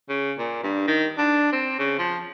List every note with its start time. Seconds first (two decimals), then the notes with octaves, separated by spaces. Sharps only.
0.09 C#3
0.38 A#2
0.63 G2
0.88 D#3
1.18 D4
1.52 C4
1.79 C#3
1.99 F3